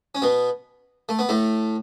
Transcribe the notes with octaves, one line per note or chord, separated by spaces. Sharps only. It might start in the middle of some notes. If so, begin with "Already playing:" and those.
C#4
B2 B3
A3
B3
A2 A3